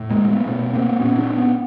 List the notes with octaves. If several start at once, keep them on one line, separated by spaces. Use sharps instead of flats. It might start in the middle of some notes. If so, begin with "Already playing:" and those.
Already playing: A2
G#3 A#3
A3 B3
B2 A3 B3
A#3 C4
A#2 B3 C#4
C4 D4
B3 C#4